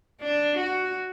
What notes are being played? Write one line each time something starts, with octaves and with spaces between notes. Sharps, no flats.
D4
F#4